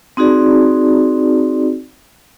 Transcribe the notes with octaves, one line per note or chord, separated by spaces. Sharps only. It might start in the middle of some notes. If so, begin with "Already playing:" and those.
C4 D#4 F#4 G#4 D5